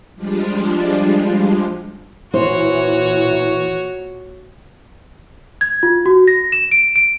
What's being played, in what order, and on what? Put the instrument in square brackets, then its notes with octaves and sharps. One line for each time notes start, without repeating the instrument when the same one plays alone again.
[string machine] F3 G3 G#3 D4 F4
[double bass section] A#2 [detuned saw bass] E3 [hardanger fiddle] F#4 C#5 [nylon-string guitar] C5
[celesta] G#6
F4
F#4
A#6
E7
D7
D7